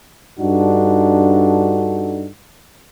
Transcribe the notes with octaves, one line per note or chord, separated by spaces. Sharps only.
G2 D4 D#4 F#4 A4